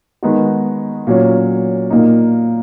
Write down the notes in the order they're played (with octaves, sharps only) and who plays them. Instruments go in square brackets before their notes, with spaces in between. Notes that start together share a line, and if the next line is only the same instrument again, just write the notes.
[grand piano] D#3 G#3 B3 D#4 F#4
A#2 F#3 C#4
A#2 A#3 D#4